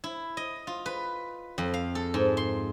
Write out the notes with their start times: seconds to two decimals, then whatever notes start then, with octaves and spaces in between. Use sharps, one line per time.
0.04 E4
0.37 D#5
0.67 F4
0.86 B4
1.58 F2
1.74 F5
1.95 A4
2.14 G#2
2.37 C6